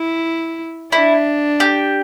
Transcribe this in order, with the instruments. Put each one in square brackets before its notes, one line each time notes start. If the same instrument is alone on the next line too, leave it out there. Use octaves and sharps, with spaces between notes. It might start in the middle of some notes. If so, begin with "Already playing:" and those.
Already playing: [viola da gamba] E4
[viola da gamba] D4 [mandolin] E4
[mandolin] G4